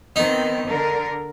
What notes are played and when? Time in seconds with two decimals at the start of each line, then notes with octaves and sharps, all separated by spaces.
0.16 D#3 B3 C4 D#4
0.67 D3 A#4